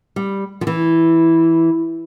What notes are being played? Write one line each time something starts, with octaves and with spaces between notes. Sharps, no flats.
G3
F3
E3